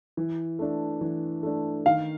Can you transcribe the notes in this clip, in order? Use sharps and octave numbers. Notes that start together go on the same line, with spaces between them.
E3
A3 D4
E3
A3 D4
D#3 F5